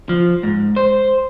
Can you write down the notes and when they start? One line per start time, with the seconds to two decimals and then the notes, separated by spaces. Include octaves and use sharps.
0.09 F3
0.43 G#2
0.76 C5